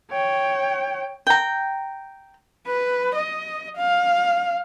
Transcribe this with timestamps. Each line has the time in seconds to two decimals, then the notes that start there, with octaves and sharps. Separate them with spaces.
0.11 C#5 G5
1.27 G5 A#5
2.67 B4
3.15 D#5
3.77 F5